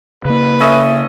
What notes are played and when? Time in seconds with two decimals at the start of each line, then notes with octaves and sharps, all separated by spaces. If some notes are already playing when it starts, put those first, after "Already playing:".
0.25 C#3 A#3 B4
0.60 C#4 A4 D#5 E5